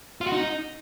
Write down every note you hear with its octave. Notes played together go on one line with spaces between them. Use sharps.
F4
F#4
D#4